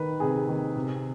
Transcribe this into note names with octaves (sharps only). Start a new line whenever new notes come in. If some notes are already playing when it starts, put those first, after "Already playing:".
Already playing: D#3 B4
C3 G#4
D#3
C3